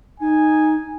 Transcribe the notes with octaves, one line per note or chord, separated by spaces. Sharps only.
D#4 G#5